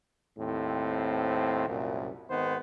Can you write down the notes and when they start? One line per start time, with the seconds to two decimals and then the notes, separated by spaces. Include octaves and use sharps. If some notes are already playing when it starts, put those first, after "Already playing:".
0.38 D#2 A2 C4
1.68 C2 F#2 A#2
2.30 G#1 D#3 B3 C5